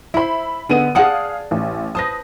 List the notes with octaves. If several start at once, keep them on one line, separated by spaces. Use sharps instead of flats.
E4 C5 E5 B5
D3 B3 G#4 D#5 D#7
G#4 D5 F5 F#5 A5 D#6
A1
B4 C5 A5 D#6 A#6